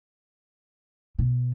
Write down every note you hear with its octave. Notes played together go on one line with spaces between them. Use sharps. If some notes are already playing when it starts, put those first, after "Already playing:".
B2